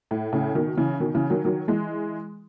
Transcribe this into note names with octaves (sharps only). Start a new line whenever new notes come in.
A2
A2 C#3
B2 D#3
C#3 E3
B2 D#3
C#3 E3
D#3 F#3
D#3 F#3
E3 G#3